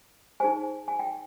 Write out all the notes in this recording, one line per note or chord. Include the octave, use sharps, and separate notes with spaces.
D#4 G#4 C5 G#5
G#5
G5